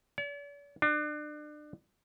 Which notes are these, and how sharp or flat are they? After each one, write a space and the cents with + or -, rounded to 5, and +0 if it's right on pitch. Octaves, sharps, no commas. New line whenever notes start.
D5 -45
D4 +30